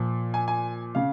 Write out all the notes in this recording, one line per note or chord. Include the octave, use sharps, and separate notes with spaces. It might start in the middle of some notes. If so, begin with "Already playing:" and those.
Already playing: A#2 F3
G#5
G#5
C#3 F5